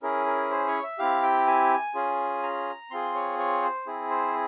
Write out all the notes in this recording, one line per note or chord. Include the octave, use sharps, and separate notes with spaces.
C#4 E4 G#4 A#4
A#4
C5
C#5
E5
C4 E4 G4 F5
G5
G#5
C#4 F4 G#4
A#5
C4 F4 G#4 C6
C#5
C#5
C5
C4 E4 G#4
C5